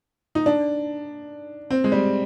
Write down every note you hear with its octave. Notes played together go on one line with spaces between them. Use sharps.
D#4
D4
C4
G#3
G3